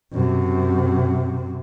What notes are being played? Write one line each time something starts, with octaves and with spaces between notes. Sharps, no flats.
F#2 C3